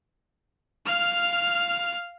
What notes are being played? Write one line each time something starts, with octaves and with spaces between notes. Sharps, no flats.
F5 F6